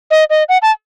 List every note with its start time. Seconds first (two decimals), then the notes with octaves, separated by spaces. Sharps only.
0.11 D#5
0.30 D#5
0.49 F#5
0.62 A5